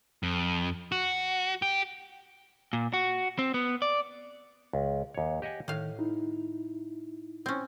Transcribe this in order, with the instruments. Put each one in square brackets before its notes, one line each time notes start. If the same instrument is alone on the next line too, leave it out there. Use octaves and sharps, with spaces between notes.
[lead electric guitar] F2
F#4
G4
A#2
F#4
C4
B3
D5
[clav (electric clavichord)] C#2
D#2 C#5
G4 D#5 F#5 G#5
[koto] A2 F5 [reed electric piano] D#3
[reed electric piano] D#4 E4
[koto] C4 C#4